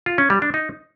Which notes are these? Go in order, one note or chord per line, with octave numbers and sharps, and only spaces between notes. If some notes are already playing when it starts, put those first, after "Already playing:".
F4
C#4
G3
D4
D#4